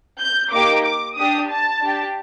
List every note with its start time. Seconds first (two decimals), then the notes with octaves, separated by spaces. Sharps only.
0.19 G6
0.52 A#3 D#4 G4 D6
0.84 D6
1.17 D4 G4 D#6
1.50 A5
1.82 D4 G4